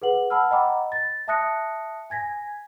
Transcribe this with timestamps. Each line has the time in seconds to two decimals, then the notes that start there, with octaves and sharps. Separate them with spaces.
0.02 G#4 B4 F#5 F#7
0.30 F#5 A5 B5 E6 F6
0.51 D#5 F#5 G5 A#5 B5 D6
0.92 A6
1.28 E5 A5 D#6 F#6 A#6 C#7
2.10 G#5 G#6 A#6 B6